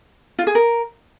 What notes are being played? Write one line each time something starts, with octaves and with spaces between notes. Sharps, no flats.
F4
G#4
A#4